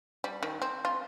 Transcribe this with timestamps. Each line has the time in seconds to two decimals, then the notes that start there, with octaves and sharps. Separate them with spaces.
0.24 G3
0.43 D#3
0.62 C4
0.85 F4